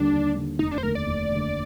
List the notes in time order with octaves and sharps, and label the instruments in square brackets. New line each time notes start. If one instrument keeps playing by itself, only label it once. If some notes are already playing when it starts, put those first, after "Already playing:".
Already playing: [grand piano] D#2 D3 G3 [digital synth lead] D4
[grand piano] D#2
D3 G3
[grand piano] F1 [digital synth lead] D#4
[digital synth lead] D4
C5
[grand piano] D#2 D3 A3 [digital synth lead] A#4
[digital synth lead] D5
[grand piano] F1
D#2 D3 A3